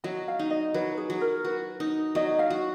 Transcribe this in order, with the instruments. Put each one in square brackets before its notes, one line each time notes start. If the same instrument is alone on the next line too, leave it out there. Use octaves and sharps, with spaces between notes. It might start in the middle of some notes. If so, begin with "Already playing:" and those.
[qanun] F#3 [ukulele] D#5
[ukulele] F5
[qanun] D#4
[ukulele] D#5
[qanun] F#3 [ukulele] B4
[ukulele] G#4
[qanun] F#3
[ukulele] A#4
[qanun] F#4 [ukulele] B4
[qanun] D#4
[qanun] F#3 [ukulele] D#5
[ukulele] F5
[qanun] F#4